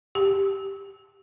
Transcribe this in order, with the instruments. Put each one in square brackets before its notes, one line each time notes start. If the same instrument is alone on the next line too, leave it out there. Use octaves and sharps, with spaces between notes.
[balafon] G4